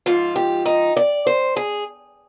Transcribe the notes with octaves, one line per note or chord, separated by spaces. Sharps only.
G#2 F3 F4
G4
D#4
D5
C5
G#4